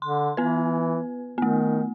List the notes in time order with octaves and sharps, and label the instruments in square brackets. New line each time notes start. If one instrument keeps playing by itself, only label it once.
[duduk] D3 [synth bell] C6
[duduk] E3 [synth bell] B3 B4
[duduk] D#3 [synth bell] A3 B3